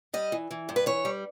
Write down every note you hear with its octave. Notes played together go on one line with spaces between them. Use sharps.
G3 D#5
E3
E3
G2
B4
E3 C#5
G3